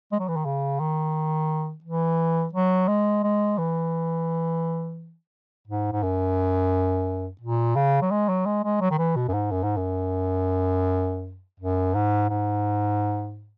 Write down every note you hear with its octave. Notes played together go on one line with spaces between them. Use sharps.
G#3
F#3
E3
D#3
C#3
D#3
E3
F#3
G#3
G#3
E3
G#2
G#2
F#2
A#2
C#3
F#3
G#3
F#3
G#3
G#3
F#3
D#3
E3
B2
F#2
G#2
F#2
G#2
F#2
F#2
G#2
G#2